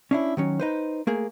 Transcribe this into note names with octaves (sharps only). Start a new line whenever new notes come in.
C#4 D4 E4
D#3 F#3 C#4
D#4 B4 C5
A3 A#3 G#4